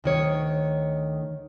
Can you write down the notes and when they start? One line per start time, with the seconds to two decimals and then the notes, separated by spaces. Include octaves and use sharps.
0.04 D2 D#3 C#5